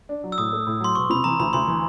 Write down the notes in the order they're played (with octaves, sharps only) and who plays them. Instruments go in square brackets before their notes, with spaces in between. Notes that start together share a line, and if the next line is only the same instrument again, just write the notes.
[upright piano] D4
F#3
[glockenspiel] E6
[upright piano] A2 [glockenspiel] D#6
[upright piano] A3
A2
[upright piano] F#3 [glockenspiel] C6
[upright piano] E1 [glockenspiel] C#6
[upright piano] C3 [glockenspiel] B5
[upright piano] E3 [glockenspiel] A#5
[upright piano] D2 [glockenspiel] B5
[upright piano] D2 [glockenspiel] C6
[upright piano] E3